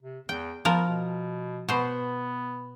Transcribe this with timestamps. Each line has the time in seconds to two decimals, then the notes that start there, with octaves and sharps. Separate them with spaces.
0.02 C3
0.29 E2 G5
0.65 F3 B3 A#4
0.89 B2
1.69 B2 B3 C5